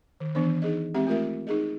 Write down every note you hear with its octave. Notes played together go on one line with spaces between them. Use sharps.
D#3
E3 B3 D4 C5
D#4 G#4 D#5
G#3 C4 G4 E5
A3 F4 A#4 E5
D#4 G#4 D#5